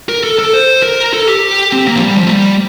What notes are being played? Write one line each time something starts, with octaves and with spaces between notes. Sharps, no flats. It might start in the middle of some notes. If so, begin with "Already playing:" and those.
A#4
A4
A4
C5
A#4
A4
G4
C4
A#3
F3
G3
F3
A3
G3